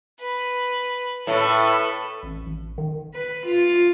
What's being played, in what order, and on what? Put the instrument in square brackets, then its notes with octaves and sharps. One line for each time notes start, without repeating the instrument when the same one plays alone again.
[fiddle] B4
[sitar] A2 [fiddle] A4 B4
[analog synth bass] A1
A1
D#3
[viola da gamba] B4
F4